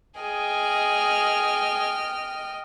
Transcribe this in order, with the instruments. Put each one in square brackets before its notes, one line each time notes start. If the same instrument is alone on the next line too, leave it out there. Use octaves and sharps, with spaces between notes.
[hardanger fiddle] G#4 [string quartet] D#5 G5 F6